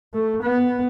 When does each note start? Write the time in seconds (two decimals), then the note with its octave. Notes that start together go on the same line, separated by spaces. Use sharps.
0.14 A3
0.43 B3